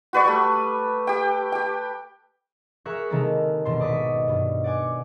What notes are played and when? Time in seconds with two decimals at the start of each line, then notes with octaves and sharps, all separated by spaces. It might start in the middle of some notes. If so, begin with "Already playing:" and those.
0.13 F#4 B4 D5 C#6
0.25 G3 A3
1.07 G4 G5
1.52 G4 G5
2.85 G#4 A#4 E5 C#6 F6 F#6
3.10 C3 D#3 G#3 A#3 A4 A#4
3.65 D#1 B2 A4 C6
3.79 G#1 D5 D#5 C#6 B6
4.28 G2 B2
4.64 D5 F#5 G#5 D6